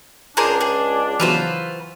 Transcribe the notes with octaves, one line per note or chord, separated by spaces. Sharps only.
C#2 D4 G#4 A#4 C5
G#4
E3 F#3 F4 B4 C5